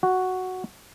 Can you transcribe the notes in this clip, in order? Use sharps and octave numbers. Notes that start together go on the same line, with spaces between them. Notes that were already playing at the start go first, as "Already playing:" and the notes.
F#4